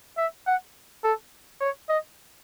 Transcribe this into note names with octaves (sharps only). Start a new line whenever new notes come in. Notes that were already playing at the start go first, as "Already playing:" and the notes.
E5
F#5
A4
C#5
D#5